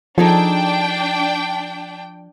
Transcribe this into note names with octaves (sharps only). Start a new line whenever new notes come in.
F3 D4 D#4 G#4 A4 G5